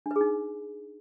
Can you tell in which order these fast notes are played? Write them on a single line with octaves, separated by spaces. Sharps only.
D4 B4 G#4 D#4